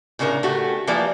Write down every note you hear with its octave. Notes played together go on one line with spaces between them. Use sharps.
A2 C#3 D4 D#4 A#4
A3 F#4 G4
E3 F3 G3 A#3 B4 D5